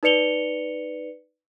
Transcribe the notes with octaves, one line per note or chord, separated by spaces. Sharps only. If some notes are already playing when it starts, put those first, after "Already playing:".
D#4 B4 D5 C#7 F7 G7